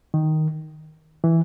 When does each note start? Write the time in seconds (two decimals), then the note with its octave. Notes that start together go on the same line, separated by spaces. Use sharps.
0.14 D#3
1.24 E3